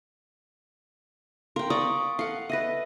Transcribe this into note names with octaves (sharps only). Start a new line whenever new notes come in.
A#4 F5 G5 C6
D5 F5 A#5 C#6 D#6
A4 F5 F#5
B4 D#5 E5 A#6